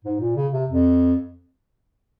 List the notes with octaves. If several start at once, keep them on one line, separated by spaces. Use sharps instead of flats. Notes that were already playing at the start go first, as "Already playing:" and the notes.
G#2
A#2
C#3
C3
F2